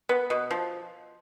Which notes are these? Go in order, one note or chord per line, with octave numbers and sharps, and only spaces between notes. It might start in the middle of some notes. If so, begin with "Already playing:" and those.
B3
B2
F3